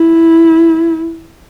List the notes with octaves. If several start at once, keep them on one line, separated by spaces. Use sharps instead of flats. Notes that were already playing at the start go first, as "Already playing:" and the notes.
Already playing: E4